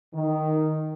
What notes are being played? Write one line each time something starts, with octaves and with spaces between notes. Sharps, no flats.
D#3